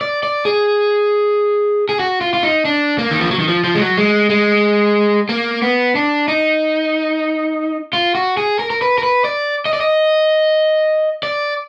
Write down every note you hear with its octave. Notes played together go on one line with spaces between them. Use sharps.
D5
D5
G#4
G#4
F#4
F4
F4
D#4
D4
A#3
D#3
F3
F#3
D#3
F3
F3
G#3
F#3
G#3
G#3
A#3
B3
D4
D#4
F4
F#4
G#4
A#4
A#4
B4
A#4
B4
D5
D#5
D5
D#5
D5